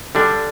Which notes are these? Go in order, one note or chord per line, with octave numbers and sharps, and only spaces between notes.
D3 G3 D4